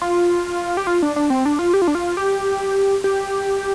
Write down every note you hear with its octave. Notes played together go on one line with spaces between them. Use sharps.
F4
G4
F4
D4
D4
C4
D4
F4
G4
F4
D4
F4
G4
G4